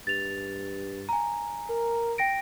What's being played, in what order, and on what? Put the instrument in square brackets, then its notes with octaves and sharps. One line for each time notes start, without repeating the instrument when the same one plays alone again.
[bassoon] G2 [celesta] A6 F7
[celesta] G#5 A#5
[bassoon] A#4
[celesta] G5 A#6 D7